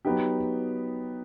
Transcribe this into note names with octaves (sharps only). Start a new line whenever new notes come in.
F#3 B3 D#4 G4